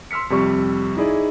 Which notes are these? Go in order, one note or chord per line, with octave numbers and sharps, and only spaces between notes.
C6 E6 F6 B6 C#7
F2 C3 G3 C#6
D#4 E4 G#4 D5